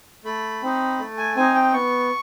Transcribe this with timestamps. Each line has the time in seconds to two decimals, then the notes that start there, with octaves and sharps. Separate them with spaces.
0.25 A3 B5
0.62 C4 D#4
0.99 A3
1.17 G#5
1.35 C4 D#4 G#5
1.54 G5
1.72 B3 C#6